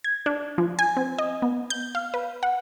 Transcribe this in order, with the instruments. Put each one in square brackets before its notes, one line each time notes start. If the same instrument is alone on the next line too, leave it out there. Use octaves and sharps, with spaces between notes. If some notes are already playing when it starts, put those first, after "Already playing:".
[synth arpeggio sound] G#6
D4
F3
G#5
C4
D#5
B3
G6
F5
B4
F#5